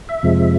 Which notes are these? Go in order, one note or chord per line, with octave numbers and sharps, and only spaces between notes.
E5
F2 C3 F3 G#3